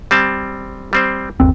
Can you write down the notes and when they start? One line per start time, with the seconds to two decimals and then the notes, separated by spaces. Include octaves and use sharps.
0.11 G3 C4 A5
0.93 G3 C4 C5
1.40 G1 D#2 C4